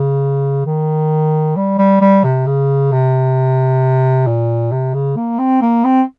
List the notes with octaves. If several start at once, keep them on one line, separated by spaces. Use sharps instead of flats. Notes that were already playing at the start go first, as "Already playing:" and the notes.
Already playing: C#3
D#3
G3
G3
G3
C3
C#3
C3
A#2
C3
C#3
A#3
C4
A#3
C4